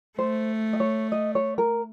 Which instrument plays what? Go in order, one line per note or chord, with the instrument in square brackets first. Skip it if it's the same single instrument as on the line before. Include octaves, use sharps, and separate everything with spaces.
[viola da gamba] A3 [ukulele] C5
[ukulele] D#5
C#5
D#5
C#5
A#4